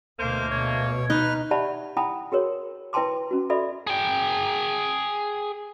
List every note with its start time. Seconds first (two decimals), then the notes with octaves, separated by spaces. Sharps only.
0.19 D2 B2 A3 A#3 C5
0.51 B2 C#5
1.10 D#4 B4 F6
1.51 G4 D5 E5 F#5 A5 B5
1.97 E4 F#5 G5 A5 B5 D#6
2.32 F#4 G#4 A#4 C#5
2.93 E4 B4 G5 A5 C6 D6
3.31 C#4 F#4
3.50 F#4 A4 D5 E5 B5
3.87 G#4 G5